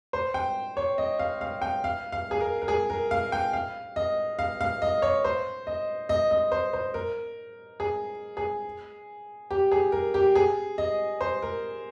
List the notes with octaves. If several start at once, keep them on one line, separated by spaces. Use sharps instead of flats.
C5
G5
C#5
D#5
F5
F5
G5
F5
F5
G#4
A#4
A#4
G#4
A#4
F5
G5
F5
D#5
F5
F5
D#5
C#5
C5
D#5
D#5
D#5
C5
C5
A#4
G#4
G#4
G4
G#4
A#4
G4
G#4
D#5
C5
A#4